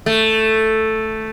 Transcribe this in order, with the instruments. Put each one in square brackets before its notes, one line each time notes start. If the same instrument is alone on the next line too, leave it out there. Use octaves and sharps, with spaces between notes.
[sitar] A3